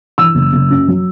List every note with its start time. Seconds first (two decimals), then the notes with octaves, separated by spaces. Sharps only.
0.18 E3 E6
0.35 F#1
0.53 F#1
0.70 F#2
0.88 F#3